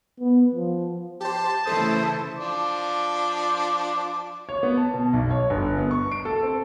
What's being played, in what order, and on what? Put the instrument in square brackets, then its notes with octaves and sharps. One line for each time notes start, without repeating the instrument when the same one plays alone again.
[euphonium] B3
F3
[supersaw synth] G4 C5 [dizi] A5
[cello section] C#3 E3 E4 [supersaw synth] A3 A4 D#6 [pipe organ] C5
[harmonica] F3 D4 D6
[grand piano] C#5
B3
A5
B2
B1
C#5
G1
B3
C#6
D7
A4
C4